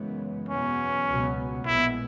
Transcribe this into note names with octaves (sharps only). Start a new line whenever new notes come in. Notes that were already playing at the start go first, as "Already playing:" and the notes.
Already playing: F#2 C#3 E3 G#3 B3
E2 B2 F#3 B3 C#4
C#2 B2 F#3 B3
A#1 A#2 G#3 B3 E4